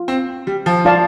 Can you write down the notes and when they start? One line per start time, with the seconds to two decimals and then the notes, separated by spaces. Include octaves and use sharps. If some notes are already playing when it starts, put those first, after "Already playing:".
Already playing: F4
0.08 C4
0.47 G3
0.66 F3
0.85 F4 D5 F5 A5